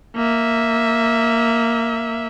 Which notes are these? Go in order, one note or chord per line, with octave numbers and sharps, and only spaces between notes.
A#3 E5